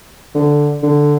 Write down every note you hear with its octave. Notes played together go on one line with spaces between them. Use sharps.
D3
D3